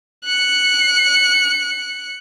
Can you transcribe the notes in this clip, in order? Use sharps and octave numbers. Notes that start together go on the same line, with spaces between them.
F#6 C#7